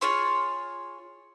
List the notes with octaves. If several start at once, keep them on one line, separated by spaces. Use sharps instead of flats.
F4 G#4 C#5 C6